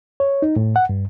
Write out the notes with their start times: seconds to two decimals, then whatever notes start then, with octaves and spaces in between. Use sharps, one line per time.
0.20 C#5
0.42 D#4
0.56 A2
0.76 F#5
0.89 G2